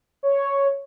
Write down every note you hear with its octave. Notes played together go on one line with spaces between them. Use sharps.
C#5